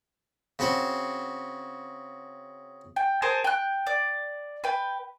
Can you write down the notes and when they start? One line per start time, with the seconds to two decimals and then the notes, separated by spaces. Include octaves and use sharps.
0.59 C#3 C4 F#4 C5
2.96 G5
3.22 G#4 A#4 C5 A5
3.44 G5 F#6
3.87 D5
4.64 B4 G5